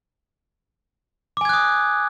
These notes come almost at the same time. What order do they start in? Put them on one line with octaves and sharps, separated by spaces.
D6 G#5 G#6 F#6 D#6